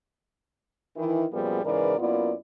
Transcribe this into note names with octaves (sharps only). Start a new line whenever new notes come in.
D#3 E3 E4
F#2 A#2 F3 G3 B3 G#4
G#2 C#3 E3 A#4 B4 D5
F#2 A#3 B3 E4 F4 D5